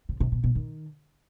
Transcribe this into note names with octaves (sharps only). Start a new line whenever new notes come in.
C3
C3
B2
B2
D#3